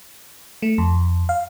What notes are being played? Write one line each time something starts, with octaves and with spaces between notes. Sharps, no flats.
A3
F2
F5